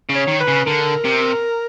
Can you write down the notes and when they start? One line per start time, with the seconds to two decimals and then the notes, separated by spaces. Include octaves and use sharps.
0.09 C#3
0.15 C#5
0.27 D#3
0.40 B4
0.47 C#3
0.66 D3 A#4
1.04 C3